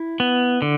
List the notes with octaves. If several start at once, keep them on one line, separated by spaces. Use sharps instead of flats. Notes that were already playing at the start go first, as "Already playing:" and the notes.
Already playing: E4
B3
D3